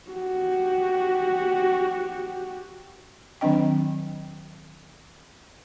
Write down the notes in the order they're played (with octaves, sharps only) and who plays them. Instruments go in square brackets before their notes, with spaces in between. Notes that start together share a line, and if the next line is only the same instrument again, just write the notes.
[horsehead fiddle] F#4 G4
[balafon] D#3 F#3 C4 D4 D#5 G5